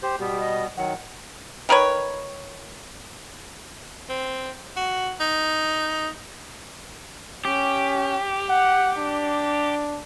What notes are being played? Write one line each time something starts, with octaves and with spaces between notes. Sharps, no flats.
G4 C5
B2 G3 B3 G4
D#5
D#3 F#3 F#5
D#3 A#4 B4 C#5
C4
F#4
D#4
C#4 G4
F#5
D4